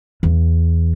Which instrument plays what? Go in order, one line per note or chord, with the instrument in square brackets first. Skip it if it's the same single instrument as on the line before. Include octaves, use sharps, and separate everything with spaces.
[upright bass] E2